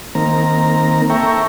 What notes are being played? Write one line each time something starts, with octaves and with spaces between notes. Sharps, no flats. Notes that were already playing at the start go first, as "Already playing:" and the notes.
D#3 A#3 C4 A#5
A4 E5 G5 A#5 C#6